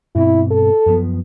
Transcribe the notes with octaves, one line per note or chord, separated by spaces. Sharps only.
G2 B2 C4 E4
A4
F#2 F3 B3